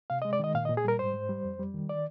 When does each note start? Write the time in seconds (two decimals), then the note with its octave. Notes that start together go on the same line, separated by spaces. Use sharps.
0.10 C3 F5
0.22 D#5
0.25 G#3
0.33 D5
0.40 D#3 D#5
0.54 A#2 F5
0.65 D#5
0.69 A#2
0.77 G#4
0.85 G3 A#4
0.99 G#2 C5
1.14 G#2
1.29 G3
1.44 F2
1.59 G3
1.74 D#3
1.89 D5